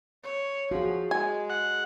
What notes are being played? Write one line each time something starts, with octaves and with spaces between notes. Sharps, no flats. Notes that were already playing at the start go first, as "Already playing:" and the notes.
C#5
F3 F#4 G#4
G#3 G#5
F#5